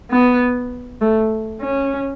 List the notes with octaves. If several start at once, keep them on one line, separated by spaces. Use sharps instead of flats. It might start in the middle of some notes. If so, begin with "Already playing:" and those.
B3
A3
C#4